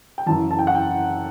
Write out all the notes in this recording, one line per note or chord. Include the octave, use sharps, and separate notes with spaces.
G5
F#1 F#2 E3 A5
A5
G5
F#5
G5